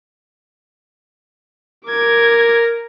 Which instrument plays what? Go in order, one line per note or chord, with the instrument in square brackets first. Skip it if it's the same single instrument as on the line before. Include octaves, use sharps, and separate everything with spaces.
[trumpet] A#4 [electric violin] D6 G#6